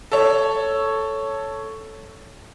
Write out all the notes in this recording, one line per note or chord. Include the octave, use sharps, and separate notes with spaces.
A4 C#5